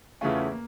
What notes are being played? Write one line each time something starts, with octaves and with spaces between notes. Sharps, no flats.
E2 C#3 E3 A3 C#4 F4
A#3